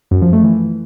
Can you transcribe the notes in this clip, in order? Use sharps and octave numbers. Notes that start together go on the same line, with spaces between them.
F#2
F3
A3
E3